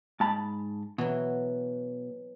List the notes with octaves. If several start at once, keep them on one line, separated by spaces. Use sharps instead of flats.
G#2 A5 B5
B2 E3 F#3